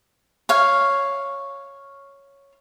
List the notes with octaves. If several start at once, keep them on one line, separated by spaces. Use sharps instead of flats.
C#5 F5